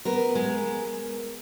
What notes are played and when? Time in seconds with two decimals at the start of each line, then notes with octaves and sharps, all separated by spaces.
0.05 B3 A#4
0.35 G#3